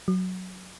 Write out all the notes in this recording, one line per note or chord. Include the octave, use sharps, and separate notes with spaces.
F#3